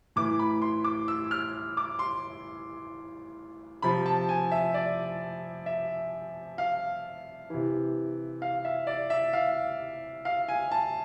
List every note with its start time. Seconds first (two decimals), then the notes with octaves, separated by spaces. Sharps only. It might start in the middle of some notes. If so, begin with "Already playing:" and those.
0.16 A2 E3 D6
0.39 B5
0.62 C6
0.84 D6
1.08 E6
1.31 F6
1.77 D6
1.99 C6
3.82 C3 F3 B5
4.06 A5
4.29 G#5
4.52 E5
4.74 D5
5.66 E5
6.58 F5
7.50 C3 E3
8.42 F5
8.65 E5
8.87 D5
9.10 E5
9.33 F5
10.25 F5
10.48 G#5
10.71 A5